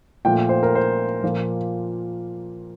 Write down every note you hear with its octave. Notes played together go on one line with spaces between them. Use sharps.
A#2 F3 A3 G5
C5
A#4
C5
A#2 F3 A#3